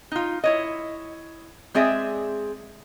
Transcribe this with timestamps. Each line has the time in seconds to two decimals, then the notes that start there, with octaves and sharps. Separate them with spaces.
0.12 D#4 F4
0.44 E4 C#5 D#5
1.75 G#3 C4 G#4 D5 E5